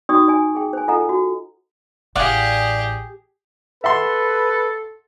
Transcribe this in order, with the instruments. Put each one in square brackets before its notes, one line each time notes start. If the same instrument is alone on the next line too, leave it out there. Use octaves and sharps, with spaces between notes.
[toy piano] D#4 F#4 D5 G5 C#6 D#6
D5 G#5
G#4 G5
C5 G#5
F4 A4 D#5 F#5 G#5 A#5
F#4
[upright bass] A1 [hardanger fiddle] G4 G#4 [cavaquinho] D5 F5 F#5
[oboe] A4 [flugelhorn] B4 [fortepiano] E5 F#5 C6